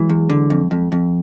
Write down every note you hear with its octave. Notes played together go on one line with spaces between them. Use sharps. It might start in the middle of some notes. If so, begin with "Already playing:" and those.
Already playing: E3 F#3 G#3
E2
D3
F2
F2
F2